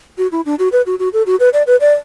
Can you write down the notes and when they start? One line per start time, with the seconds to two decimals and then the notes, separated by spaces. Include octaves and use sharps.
0.18 F#4
0.32 E4
0.46 D4
0.59 F#4
0.72 B4
0.86 F#4
0.99 F#4
1.13 A4
1.26 F#4
1.40 B4
1.53 D5
1.67 B4
1.81 D5